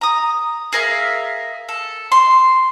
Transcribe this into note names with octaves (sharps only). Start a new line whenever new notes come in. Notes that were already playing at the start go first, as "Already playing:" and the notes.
A#5 D#6
G#4 A#4 E5 F5
A4
C6